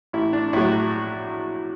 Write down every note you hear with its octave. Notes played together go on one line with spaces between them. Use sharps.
A1 E4
D4
A2 F#3 E4
F#4